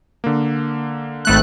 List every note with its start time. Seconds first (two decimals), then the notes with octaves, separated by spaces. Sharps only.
0.24 D3 A#3
1.25 G#1 A3 F#6